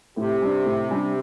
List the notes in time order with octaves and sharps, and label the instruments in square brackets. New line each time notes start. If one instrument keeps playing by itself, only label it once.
[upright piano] A2 [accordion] C3
[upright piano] G3 D4
A2
G3 D4